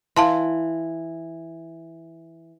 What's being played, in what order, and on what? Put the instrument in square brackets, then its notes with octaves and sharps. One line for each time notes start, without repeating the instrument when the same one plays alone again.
[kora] E3 [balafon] F5 A5 C6